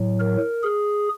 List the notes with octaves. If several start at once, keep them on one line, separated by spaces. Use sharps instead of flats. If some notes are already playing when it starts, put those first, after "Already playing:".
Already playing: A2 F#3
A#4
G#4